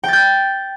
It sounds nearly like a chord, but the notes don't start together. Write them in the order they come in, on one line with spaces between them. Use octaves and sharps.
G5 A6 G6